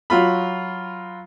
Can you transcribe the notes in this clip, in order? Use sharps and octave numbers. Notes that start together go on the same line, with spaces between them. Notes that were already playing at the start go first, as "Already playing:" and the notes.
F#3 F4 B5